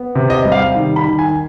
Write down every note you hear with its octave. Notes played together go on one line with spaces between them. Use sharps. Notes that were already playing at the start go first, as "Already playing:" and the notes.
Already playing: B3
C3
D#5
G3
F5
D#3
B5
D#3
G#5